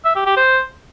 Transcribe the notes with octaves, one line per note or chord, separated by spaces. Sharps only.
E5
G4
G4
C5